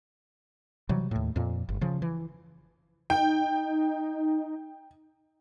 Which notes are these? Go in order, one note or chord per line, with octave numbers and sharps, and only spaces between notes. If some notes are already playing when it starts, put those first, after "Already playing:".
C3 E3 F#3 G3
D#2 A2
F2 A#2
G1
C#3 F3
E3
D#4 G5